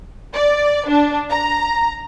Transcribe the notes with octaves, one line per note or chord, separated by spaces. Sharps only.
D5
D4
A#5